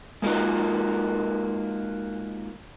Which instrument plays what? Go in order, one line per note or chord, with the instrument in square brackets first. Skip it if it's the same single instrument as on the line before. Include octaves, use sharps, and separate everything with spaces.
[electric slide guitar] G#3 A#3 D#4 F4 F#4 A#4